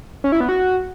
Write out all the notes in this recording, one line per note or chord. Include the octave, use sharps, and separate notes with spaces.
C#4
E4
B3
F#4